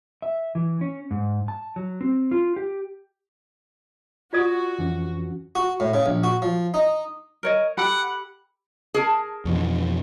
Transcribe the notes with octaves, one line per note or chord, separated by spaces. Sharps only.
E5
E3
C#4
G#2
A5
F#3
C4
F4
G4
F4 F#4 D5 D#6
F2 E3 C#4
F#4
A2
C#3
A#1
F#4
F3
D#4
A#4 C#5 D#5
G4 A4 F#5 B5
G#4 A#4 A5
F2 B2 E3